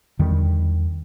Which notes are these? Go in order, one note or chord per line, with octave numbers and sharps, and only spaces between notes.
E2 D3 D#3 G3